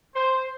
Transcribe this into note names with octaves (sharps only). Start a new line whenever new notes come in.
C5